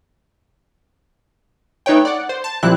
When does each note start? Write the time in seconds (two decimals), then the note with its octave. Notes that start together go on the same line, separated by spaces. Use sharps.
1.86 A3 D#4 B4 C#5 G5
2.05 D5 F#5
2.29 C5
2.44 A5
2.63 A#2 F3 G3 C4 E4 F#6